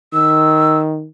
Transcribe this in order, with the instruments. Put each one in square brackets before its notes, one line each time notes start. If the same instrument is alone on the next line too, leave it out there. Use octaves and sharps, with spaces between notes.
[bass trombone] D#3 [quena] E6